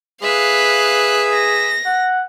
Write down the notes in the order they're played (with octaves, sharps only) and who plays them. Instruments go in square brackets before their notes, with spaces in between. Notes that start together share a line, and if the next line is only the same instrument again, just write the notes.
[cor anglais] G#4 [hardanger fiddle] B4 E5 [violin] F5 F#6
[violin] A#6
[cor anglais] F#5